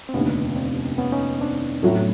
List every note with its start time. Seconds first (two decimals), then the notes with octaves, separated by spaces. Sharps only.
0.09 C4
0.14 F1 D#2 D3 B3 C#4
0.56 C4 D4
0.98 B3 C#4
1.12 C#4 D#4
1.41 C4 D4
1.83 A2 F#3 A3